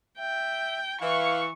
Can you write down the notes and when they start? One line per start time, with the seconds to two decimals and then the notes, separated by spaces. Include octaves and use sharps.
0.19 E5 G5
1.01 E3 F5 C#6